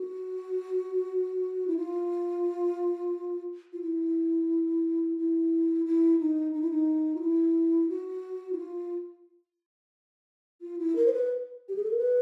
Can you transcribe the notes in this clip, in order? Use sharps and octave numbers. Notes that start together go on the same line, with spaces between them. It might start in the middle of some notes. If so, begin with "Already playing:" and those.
Already playing: F#4
E4
F4
F4
E4
E4
E4
D#4
D#4
E4
D#4
F4
E4
F#4
E4
F4
F4
E4
A#4
C5
B4
G4
G#4
A4
A#4
B4